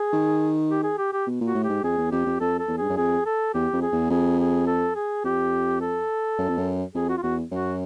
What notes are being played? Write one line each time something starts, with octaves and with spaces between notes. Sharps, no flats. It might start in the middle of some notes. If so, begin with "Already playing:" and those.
Already playing: G#4
D#3
G4
G#4
G4
G4
B2
A#2 F#4
A2
G4
G#2
F2 G#4
E2
F2 G4
F2
F2 A4
A4
E2
G2 G#4
F#2
F2 G#4
A4
E2 G4
F2
G#4
E2
F2 G#4
G#4
A4
G#4
F2 G4
A4
F#2
F2
F#2
F2 G#4
F#4
F4
E2 F#4
F#2 F#4